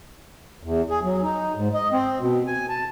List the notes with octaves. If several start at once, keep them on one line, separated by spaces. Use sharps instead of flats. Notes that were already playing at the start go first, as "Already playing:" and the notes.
E2
G#4
F#3
D#4
G#2
D#5
C4
B2
G#5
A5